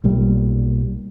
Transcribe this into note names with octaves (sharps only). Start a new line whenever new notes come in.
B1 A#2 G3